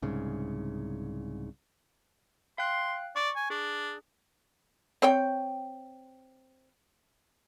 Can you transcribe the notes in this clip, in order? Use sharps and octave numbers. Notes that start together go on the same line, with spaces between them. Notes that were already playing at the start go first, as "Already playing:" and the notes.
C2 G#2 C#3
F5 G5 C6 F#6
D5 C#6
G#5
D4 G#4
C4 C#5 G5